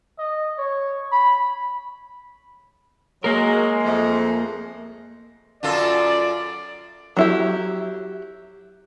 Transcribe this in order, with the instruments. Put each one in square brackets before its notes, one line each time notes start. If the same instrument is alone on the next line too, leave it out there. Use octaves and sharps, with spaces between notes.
[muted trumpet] D#5
C#5
B5
[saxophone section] F#3 [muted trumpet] G#3 [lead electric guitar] A#3 A#4 [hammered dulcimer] G#4
[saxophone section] F2 A3
[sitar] F#2 F4 A4 [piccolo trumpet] D5
[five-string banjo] F#3 E4 G4